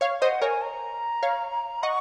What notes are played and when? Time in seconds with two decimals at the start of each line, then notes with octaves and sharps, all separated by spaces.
0.01 C#5 F5 C#6
0.22 C5 D#5 F#5
0.42 A#4 C#5 G#5
0.62 A#5
1.23 C#5 F5
1.83 D#5 F#5 C#6